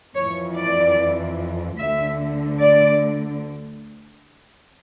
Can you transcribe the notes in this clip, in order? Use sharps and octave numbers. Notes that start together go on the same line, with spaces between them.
F2 E3 C#5
D5
D2 D3 E5
D5